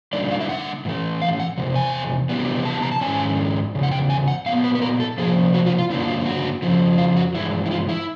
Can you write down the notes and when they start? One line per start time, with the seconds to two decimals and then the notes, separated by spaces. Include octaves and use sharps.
0.13 D3 G3 A#3 D#4 D5
0.31 F5
0.40 E5
0.49 F#5
0.85 A2 E3 A3
1.22 F5
1.40 F#5
1.57 E2 C3
1.75 G#5
2.29 C3 E3 G3 B3
2.65 A5
2.82 A#5
2.92 A5
3.01 G#2 D#3 G#3 C#4 E4 G#5
3.75 E2 C#3
3.83 F#5
3.92 G5
4.10 G#5
4.28 F#5
4.46 A#2 F#3 B3 F5
4.64 B4
4.75 B4
4.82 A#4
5.00 A4
5.18 C3 F3 A#3 G#4
5.54 F#4
5.66 F4
5.78 F4
5.90 G2 D3 F#3 A#3 D4 E4
6.00 F#4
6.08 F4
6.26 F#4
6.62 F2 C#3 F3
6.98 F4
7.17 F#4
7.34 G2 E3 G#3 E4
7.66 E4
7.71 F4
7.89 E4